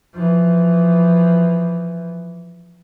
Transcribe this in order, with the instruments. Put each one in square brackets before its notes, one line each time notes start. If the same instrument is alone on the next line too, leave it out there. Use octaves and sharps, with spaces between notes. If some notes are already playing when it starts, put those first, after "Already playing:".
[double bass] E3 F3